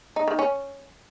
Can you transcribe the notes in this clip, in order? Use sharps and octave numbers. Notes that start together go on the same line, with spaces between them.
D#4
D#3
C#4